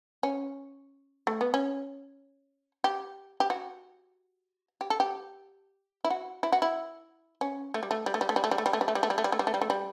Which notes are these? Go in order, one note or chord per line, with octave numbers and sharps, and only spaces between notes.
C#4
A3
B3
C#4
G4
G4
F#4
G4
A4
G4
E4
F#4
E4
F#4
E4
C#4
A3
G3
A3
G3
A3
G3
A3
G3
A3
G3
A3
G3
A3
G3
A3
G3
A3
G3
A3
G3
A3
G3
A3
G3
A3
G3